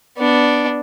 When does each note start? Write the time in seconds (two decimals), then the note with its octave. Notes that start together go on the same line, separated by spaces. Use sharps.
0.18 B3 D4